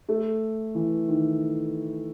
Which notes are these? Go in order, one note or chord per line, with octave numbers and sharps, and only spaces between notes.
A3
E3
D#3